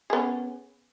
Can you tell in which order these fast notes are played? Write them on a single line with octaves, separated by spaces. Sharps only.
G#4 B3 C#4